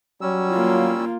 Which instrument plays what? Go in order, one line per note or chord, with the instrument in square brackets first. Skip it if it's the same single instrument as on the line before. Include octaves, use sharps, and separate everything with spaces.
[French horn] F#3 [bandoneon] G3 C#4 E6
[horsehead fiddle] A#3 F4